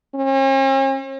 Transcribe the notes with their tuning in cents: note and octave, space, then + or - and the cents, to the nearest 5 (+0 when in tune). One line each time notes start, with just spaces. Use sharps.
C#4 -45